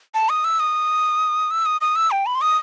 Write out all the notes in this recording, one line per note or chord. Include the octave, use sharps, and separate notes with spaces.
A5
D#6
E6
D#6
E6
D#6
D#6
E6
G5
B5
C6
D#6